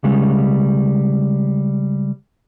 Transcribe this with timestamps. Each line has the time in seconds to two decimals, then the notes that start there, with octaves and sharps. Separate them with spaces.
0.04 C#3 G3 G#3